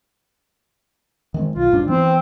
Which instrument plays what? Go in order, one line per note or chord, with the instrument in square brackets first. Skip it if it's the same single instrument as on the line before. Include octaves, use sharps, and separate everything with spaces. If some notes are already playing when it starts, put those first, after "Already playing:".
[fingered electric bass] D#3 G#3 C4
[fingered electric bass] B1 [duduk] F4
[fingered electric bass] G1 G#2 D4
[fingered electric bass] E3 B3 [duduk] C4